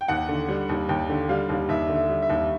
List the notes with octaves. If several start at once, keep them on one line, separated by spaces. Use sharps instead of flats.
G5
D#2 F#5
D3
G3
D#2
D#2 G5
D3
G3 F5
D#2
D#2 E5
D3
E5
G3
E5
D#2